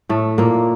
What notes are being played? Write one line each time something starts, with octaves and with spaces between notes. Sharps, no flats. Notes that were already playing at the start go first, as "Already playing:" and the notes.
A2 A3
A#2 A#3